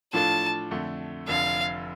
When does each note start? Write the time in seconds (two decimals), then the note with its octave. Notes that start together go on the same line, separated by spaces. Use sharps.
0.13 A2 F3 D4 F4 A4 A5
0.71 F2 D3 A3
1.28 F1 F2 D3 F3 F5